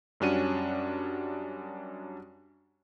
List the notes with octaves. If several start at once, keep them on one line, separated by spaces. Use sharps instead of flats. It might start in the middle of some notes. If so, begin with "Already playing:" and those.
F#2 G3 C#4 D4 F#4 D#7